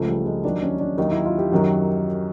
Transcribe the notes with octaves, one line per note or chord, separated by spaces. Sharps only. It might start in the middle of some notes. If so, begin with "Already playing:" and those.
Already playing: C#2 C#3 F3 A3
G3
G#3
D#2 D#3 F#3 D4
C#4
D4
D#2 D#3 F#3 D#4
E4
F4
G4
F#2 D#3 F#3